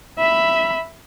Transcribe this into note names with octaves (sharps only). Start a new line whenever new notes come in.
E5 B5